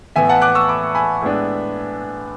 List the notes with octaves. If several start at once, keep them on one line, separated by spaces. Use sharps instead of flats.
A2 E3 B3 E5 G#5
F#5 A5
D6 F#6
C#6 E6
B5 D6
G#5 B5
A2 G#3 B3 D4